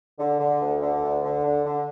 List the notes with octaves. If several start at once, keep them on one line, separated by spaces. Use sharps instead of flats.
D3
D3
D2
D3
D2
D3
D4
D3